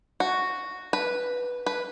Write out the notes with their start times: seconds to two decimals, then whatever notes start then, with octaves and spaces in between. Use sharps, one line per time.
0.20 F#4
0.93 B4
1.66 B4